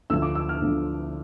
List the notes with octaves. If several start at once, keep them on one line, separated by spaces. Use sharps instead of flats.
D2 D3 F3 E6
D6
E6
F6
D2 D3 F3